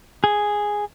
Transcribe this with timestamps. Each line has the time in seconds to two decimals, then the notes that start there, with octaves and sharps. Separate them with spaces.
0.24 G#4